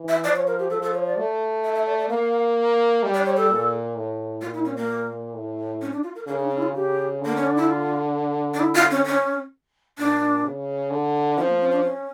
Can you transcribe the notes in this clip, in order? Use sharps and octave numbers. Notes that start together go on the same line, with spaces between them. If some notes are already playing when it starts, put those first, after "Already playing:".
Already playing: E3
E5
F3 D5
C#5
A#4
G4
F3 A4
A4
C#5
D5
A3
E5
E5
D5
D5
A#3 F5
G3
D5
C#5
A4
A#2
A2
A#2 F4
E4
C#4
A#3
A2
C#4
D4
F4
A#4
C#3 A#4
D4
C#4
E4
F4
C#3 G4
D3 A#3
C#4
D4
E4
F4
D4
E4
F4
C#4
C#4
A#2 D4
C#3
D3
F3 C#4
A#3
C#4
D4
C#4